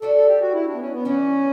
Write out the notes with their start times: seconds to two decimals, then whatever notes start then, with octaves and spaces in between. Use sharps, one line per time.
0.02 G3 D4 F#4 A4
0.15 A4
0.28 G4
0.41 F#4
0.54 E4
0.66 D4
0.74 B3
0.80 C#4
0.92 B3
1.05 E3 G3 B3 C#4